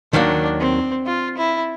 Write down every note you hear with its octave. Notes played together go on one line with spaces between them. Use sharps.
D#2 D#3 F#3 A#3 D4
C4
F4
E4